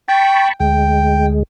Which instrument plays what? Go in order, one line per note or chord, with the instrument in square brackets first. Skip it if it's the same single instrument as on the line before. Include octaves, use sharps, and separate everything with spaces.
[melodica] G5 [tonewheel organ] A5 B5 C#6
[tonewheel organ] D2 G#3 [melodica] G5